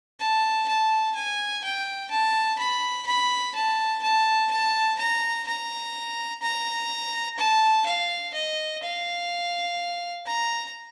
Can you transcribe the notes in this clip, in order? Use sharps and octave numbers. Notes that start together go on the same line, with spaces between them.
A5
A5
G#5
G5
A5
B5
B5
A5
A5
A5
A#5
A#5
A#5
A5
F5
D#5
F5
A#5